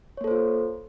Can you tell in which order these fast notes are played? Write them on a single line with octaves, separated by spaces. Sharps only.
C#5 A#3 A4 C5 F4